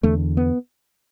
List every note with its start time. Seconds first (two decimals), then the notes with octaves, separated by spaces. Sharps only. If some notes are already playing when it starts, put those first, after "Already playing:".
0.03 E2 D3 A3
0.37 B3